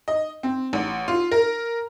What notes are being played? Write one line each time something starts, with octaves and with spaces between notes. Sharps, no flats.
D#5
C4
A1
F4
A#4